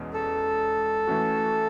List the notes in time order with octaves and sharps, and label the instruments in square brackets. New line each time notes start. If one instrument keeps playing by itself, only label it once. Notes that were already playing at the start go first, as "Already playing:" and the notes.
Already playing: [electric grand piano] E2 B2 G#3 C#4
[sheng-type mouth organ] A4
[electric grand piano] E3 A3 C#4 F#4